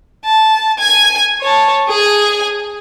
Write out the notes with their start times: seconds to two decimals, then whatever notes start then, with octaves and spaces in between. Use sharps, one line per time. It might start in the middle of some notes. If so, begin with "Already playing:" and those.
0.25 A5
0.79 G#5 G#6
1.41 C#5 A5
1.88 G#4 G#5